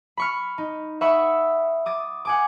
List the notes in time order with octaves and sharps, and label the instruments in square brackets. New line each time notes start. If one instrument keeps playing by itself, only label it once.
[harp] B5 C#6 F6
D#4
E5 F#5 B5 C#6 D#6
D6 D#6 A6
F#5 G#5 D6